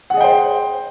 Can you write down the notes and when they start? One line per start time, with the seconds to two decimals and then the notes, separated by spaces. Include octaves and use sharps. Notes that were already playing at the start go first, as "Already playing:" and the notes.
0.10 F#5
0.14 G#4
0.17 D#5
0.21 G5
0.24 C5